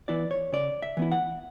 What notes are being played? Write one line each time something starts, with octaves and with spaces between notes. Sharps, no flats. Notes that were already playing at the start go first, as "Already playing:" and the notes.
E3 B3 E4 D5
C#5
C#3 D5
E5
E3 B3 E4
F#5